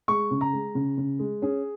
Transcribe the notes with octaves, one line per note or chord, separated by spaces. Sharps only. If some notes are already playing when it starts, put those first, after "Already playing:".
G#3 C#6
C#3
A#5
G#3
C#3
C#3
G#3
C#4 G#4